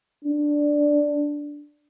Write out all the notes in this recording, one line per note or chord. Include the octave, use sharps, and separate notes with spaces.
D4